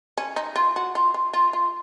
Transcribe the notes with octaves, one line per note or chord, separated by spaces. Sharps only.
C#4
D#4
F4
F#4
F4
F4
F4
F4